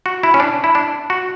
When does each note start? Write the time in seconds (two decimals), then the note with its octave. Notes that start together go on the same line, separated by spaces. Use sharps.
0.06 F#4
0.23 E4
0.34 C#4
0.40 D4
0.64 E4
0.75 D4
1.10 F#4